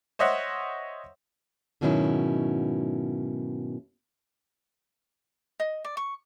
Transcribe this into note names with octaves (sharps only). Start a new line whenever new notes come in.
C5 C#5 D#5 E5 F#5
G#2 B2 D#3 F#3 C#4 E4
D#5
D5
C#6